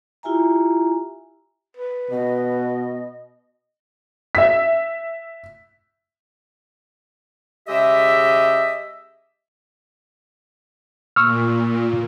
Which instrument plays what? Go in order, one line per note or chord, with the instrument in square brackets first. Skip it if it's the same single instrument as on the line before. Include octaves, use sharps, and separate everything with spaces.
[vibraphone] E4 F4 G4 E5 G#5 A#5
[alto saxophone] B4
[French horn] B2 [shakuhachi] D#5
[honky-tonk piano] E5 B6
[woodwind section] C#3 G#3 G4 D#5 E5
[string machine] A#2 [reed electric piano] C#6 E6 F6